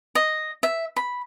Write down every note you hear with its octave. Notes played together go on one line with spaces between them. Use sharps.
D#5
E5
B5